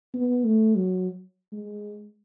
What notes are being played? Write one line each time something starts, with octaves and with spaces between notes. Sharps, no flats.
B3
A3
F#3
G#3